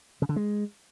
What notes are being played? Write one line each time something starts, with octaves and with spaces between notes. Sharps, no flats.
C#3
D3
G#3